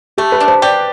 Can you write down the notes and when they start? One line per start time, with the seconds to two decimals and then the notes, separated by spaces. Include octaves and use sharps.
0.18 A3 G4
0.32 B4
0.40 D4
0.48 C5
0.62 G4 D5